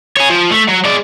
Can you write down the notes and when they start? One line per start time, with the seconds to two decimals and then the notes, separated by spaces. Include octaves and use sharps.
0.17 G#4 C#5
0.30 F3
0.51 A3
0.68 F#3
0.85 G#3 D5